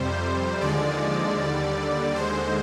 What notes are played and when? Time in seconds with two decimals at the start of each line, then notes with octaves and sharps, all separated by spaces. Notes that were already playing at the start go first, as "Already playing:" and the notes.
Already playing: F2 C3 G3 C5
0.61 D#2 D3 F3 G#3 D5
1.38 D#2 D3 G3
2.15 D#2 D3 G#3 C5